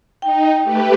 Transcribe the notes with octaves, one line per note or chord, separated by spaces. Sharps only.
D#4 G5
A3 G4 B4